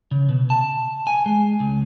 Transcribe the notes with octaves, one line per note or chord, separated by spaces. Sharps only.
C#3
B2
A5
G#5
G#3
C#2